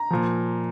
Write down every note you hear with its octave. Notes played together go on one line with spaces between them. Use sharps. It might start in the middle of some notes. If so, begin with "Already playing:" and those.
Already playing: A#5
A#2 F3